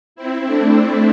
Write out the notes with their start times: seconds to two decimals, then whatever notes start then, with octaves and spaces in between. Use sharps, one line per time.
0.16 C4 E4
0.45 A3 D4